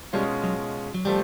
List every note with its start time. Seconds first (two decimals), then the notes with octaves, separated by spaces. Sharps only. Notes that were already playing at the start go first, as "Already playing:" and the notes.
0.13 B2 G3 G#3 C#4 F4
0.44 F#3
0.94 F#3
1.05 C3 F3 G3 A3